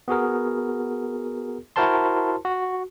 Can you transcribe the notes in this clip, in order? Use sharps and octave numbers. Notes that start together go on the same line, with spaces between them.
B3 F#4 G#4 A#4
E4 F#4 A#4 C5 A5 C6
F#4